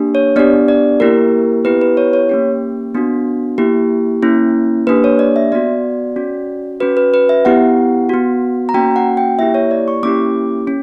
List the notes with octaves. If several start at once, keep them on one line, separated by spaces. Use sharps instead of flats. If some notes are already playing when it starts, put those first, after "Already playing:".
Already playing: A#3 D4 G4
C#5
B3 D4 G4 D5
D5
A#3 E4 G4 A#4
B3 E4 G4 B4
B4
C#5
C#5
A#3 C#4 G4
B3 D4 F#4
A#3 E4 G4
A#3 C#4 E4
A#3 D4 G4 B4
C#5
D5
E5
B3 F#4 D5
C#4 F#4
C#4 F#4 B4
B4
B4
E5
B3 E4 G4 F#5
B3 F#4
A#5
A#3 C#4 F#4 G5
F#5
G5
A#3 E4 G4 E5
C#5
D5
C#6
A#3 C#4 E4 G4 D6
C#4